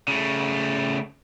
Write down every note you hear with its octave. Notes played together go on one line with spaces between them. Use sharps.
C#3 A3